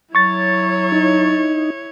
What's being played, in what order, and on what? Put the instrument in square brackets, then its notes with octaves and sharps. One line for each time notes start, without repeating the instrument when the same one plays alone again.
[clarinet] F#3 [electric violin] E4 C#5 [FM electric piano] C#6 A6
[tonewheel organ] D#4